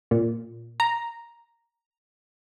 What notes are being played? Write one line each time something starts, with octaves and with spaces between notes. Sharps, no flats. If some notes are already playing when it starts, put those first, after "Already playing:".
A#2
A#5